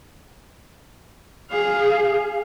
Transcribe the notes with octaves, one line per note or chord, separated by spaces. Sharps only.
G#4 F5